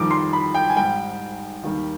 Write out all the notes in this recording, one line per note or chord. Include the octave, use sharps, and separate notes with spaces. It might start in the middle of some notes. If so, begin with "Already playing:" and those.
Already playing: F2 D#3 G3 D6
C6
B5
G5
G#5
G#2 G3 G5
D#2 D#3 G3